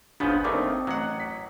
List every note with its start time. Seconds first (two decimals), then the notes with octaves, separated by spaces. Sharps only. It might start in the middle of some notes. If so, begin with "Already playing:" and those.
0.20 G1 C#3 F3 B3 D4 B4 G6
0.44 D#2 D#3 A3 C4 C5 D5 D6 D#6
0.87 A1 F#3 F#5
1.20 B6